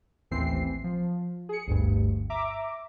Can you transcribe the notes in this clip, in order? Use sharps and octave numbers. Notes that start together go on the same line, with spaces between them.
A1 D#2 E3 C4 C7
F3
G#4 C#7
G1 D2 G2
E5 A#5 D6